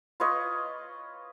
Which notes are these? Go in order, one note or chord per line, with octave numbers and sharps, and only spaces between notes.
F4 B4 C#5 D#5